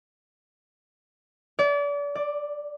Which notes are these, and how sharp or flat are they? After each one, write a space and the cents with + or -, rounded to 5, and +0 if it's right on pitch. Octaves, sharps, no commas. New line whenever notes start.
D5 -35
D5 +5